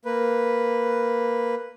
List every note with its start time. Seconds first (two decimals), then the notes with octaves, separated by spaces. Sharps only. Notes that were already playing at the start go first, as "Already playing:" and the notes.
0.05 A#3 B4